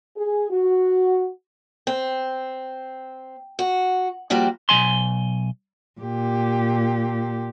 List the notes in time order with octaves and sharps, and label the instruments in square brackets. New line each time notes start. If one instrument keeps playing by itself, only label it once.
[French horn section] G#4
F#4
[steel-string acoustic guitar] C4
F#4
F3 G3 A#3 F#4 G4
[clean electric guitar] B1 F#3 G#5 C6
[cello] A#2 G4